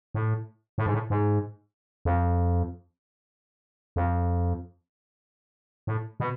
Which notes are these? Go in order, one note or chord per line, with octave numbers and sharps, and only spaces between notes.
A2
A2
G#2
A2
G#2
F2
F2
A2
B2